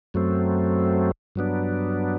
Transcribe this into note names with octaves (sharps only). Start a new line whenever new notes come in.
F#2 F#3 A3 C4
G2 F#3 B3 D4